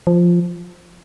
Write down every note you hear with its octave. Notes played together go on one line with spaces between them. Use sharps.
F3